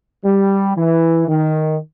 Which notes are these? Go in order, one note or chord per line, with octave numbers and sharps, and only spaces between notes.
G3
E3
D#3